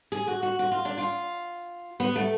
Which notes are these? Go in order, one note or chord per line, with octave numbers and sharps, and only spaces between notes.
G#4
F#4
F#4
F#4
F4
D4
F4
B3
A3